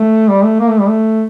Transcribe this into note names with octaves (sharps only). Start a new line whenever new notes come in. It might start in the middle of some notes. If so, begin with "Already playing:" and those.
Already playing: A3
G3
A3
A#3
A3
G3
A3